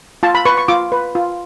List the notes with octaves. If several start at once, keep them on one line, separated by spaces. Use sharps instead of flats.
F4 A5
B5
B4 C#6
C#6
F4 D6
B4
F4